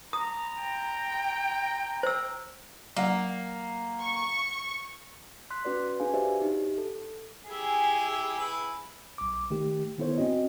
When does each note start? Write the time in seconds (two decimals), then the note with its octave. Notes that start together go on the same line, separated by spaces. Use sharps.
0.13 A#5 D#6
0.61 G5
2.03 C5 E6
2.97 F#3 A#3 F5 F#5
3.99 C#6
5.51 C6 F#6 B6
5.65 C#4 F#4 B4 D5
6.00 D4 G#4 B4 F5 G#5
6.14 F#4 G4 C5 D5 E5
6.42 D#4 G4
6.78 A4
7.48 E4 G4 G#4 E5
8.39 E4 B4
9.18 B1 D6
9.50 D#3 A3 G4
9.98 D#3 B3 E4 A4 C5 C#5
10.18 C4 C#4 F#4 D#5